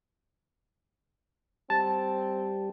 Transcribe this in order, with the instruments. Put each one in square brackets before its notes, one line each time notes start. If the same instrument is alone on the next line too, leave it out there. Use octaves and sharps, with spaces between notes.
[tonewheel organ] G3 [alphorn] C4 [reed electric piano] A5